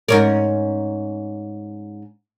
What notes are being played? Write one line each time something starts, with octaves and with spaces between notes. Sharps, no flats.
G#2 C#4 A#4